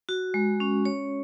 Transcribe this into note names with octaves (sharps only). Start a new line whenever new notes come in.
F#4
G#3
C#4
C#5